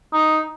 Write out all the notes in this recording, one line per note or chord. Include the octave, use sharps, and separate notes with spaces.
D#4